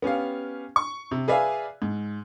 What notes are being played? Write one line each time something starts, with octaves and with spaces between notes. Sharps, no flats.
B3 C#4 G4 F5
C#6
C3
G#4 B4 D5 E5 F5 G#5
G#2